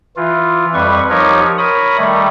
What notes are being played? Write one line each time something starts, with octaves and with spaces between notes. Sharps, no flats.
E3 F4
F2 G3 B4 C#6
F3 D#4 G4 A#4 C#5
A#4 C#5 B5 D#6
D#3 G3 A3